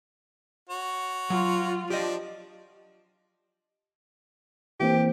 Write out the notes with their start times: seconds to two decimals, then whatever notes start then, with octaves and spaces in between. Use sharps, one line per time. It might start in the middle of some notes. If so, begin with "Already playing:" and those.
0.70 F#4 C#5
1.30 F#3 F4
1.90 F3 D4 G4 D#5
4.80 E3 A#3 C4 G4